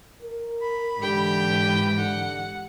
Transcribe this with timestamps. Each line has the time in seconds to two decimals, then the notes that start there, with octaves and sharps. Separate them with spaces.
0.22 A#4
0.62 B5
1.01 G#2 D3 E3 G4 G5
1.51 B4
1.97 D3 F#5